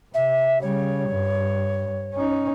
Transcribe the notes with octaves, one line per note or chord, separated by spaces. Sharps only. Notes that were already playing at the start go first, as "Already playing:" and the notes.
C3 E5
C#3 G3 C#5
G2
C#4 D#4